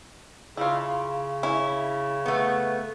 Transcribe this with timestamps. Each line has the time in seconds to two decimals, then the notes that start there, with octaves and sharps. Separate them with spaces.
0.57 C#3 E4 F4
1.43 C#4 E4
2.26 A3 B3